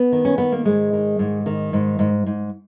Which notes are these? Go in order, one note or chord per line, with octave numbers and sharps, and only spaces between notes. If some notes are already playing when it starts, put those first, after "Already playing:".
Already playing: B3
D#3
C#4
D#3 B3
A#3
G#2 G#3
D#3
G#2
D#3
G#2
G#2
G#2